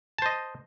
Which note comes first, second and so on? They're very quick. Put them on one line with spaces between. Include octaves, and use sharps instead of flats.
A5 C5 D#5